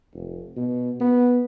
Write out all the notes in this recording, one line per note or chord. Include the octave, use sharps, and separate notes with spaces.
F1
B2
B3